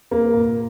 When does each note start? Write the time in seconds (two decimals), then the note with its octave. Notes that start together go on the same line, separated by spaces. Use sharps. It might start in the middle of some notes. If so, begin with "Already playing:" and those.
0.11 A#3
0.34 A#2